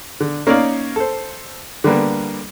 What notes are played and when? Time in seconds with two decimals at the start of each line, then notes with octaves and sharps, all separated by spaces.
0.21 D3
0.47 A#3 C#4 D#4 A#4 D5 F5
0.96 A4 C5
1.84 D3 G3 A#3 B3